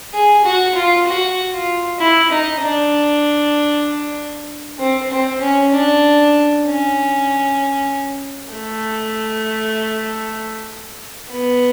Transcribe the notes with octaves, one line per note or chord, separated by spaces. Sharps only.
G#4
F#4
F4
F#4
F4
E4
D#4
D4
C4
C4
C#4
D4
C#4
A3
B3